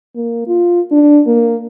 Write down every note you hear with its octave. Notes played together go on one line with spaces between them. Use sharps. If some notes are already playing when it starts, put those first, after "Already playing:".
A#3
F4
D4
A#3